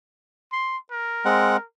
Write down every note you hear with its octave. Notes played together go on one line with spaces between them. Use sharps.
C6
A#4
G#3 C4 F#5